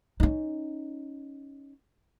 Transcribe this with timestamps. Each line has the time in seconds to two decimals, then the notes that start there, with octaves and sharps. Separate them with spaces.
0.20 C#4 D#4